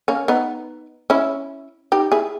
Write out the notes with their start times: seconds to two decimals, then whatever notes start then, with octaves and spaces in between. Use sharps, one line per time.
0.08 A#3 C#4
0.28 B3 D#4
1.10 C#4 E4
1.92 D#4 G4
2.12 E4 G#4